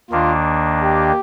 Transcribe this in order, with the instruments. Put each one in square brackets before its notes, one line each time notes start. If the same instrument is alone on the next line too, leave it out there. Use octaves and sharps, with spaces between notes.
[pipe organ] D#2 D#3 A#3 D4 [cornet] F4
[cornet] G4